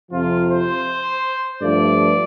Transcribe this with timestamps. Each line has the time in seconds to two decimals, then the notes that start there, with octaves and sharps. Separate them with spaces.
0.11 F2 C3 F3 F4
0.49 C5
1.61 G2 F3 A3 D5